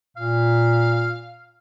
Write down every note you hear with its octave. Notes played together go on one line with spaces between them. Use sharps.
A#2 F5